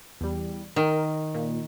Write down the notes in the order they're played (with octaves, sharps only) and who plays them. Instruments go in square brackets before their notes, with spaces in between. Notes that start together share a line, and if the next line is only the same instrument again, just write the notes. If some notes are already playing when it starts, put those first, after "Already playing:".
[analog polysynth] E2 G3
[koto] D#3 [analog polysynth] A#4
[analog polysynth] A#2